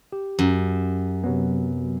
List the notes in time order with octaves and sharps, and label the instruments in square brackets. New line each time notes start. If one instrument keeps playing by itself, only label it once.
[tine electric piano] G4
[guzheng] F#2
[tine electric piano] C3 F#3 B3